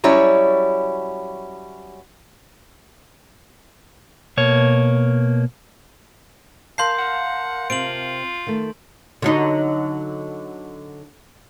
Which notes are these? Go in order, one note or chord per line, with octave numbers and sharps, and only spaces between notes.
F#3 G3 C#4 E4 C#5
B2 A#3 C#5
A#4 F5 A5 C6 G6 C7
F#5
C3 C4 F4 C5 D7 F#7
D#3 A3
D3 F#3 D#4